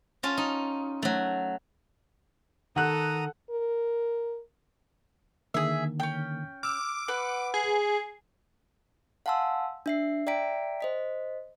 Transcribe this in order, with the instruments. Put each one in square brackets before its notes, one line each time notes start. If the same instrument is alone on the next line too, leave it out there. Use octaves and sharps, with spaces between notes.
[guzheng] C#4 F4 A5
D#4
F#3 A3
[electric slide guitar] D#3 [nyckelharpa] A4 [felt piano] F#5 F#6 [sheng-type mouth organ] A#5 D#6
[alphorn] A#4
[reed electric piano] D3 D#3 A#3 [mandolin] G#4 E5
[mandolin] C#4 G5
[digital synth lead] D6 [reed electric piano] E6 F6
[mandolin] B4 F#5
[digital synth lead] G#4
[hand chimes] F5 F#5 G#5 A5 C6 E6
D4 E5 C7
D5 E5 G5 A#5 B6 D7
C5 D#5 B6